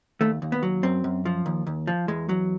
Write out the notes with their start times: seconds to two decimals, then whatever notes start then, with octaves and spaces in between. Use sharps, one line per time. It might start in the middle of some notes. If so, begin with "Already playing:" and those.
0.21 D#2 A3
0.42 D#2
0.52 B3
0.63 F#3
0.83 F#2 C4
1.04 F#2
1.25 F3
1.46 D#2
1.67 D#2
1.87 F3
2.08 E2 G#3
2.29 F#3